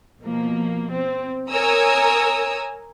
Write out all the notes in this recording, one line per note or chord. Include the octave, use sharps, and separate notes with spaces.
B2 F3 A#3
C4
A#4 C#5 G#5 A#5 D#6 E6